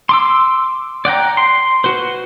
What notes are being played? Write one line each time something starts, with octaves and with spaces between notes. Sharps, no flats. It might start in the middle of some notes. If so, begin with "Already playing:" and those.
C6 D6 E6
D5 F#5 G5 A#5
C6
F#4 B4 C5